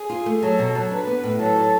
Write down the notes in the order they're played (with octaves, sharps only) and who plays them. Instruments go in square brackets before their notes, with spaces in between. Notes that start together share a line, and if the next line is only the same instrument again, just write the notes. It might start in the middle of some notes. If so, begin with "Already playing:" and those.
Already playing: [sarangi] G#4
[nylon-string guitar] F4
A3
[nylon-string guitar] F#3 [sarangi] A4
[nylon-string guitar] B2
F#3
[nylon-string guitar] D4 [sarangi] B4
[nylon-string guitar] B3
A2
[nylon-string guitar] F#3 [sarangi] A4
[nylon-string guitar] F#3